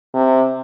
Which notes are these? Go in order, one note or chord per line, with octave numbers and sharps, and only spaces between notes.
C3